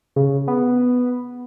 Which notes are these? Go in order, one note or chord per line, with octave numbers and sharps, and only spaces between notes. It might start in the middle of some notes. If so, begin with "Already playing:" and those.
C#3
B3